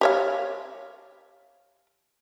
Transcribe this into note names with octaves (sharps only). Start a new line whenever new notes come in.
G4 C#5 F5